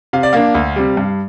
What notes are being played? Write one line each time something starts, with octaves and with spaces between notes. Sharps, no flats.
C3 F5
D5
A#3 D4 F5
D2
C3 G3
G2